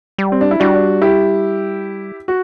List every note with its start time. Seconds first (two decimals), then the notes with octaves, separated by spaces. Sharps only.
0.18 G3
0.32 C4
0.41 D4
0.51 E4
0.60 G3 D4 F#4
1.02 E4 G4
2.28 F#4